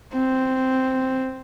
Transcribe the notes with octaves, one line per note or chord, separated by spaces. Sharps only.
C4